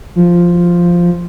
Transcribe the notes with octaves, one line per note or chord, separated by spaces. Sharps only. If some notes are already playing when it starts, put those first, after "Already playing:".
F3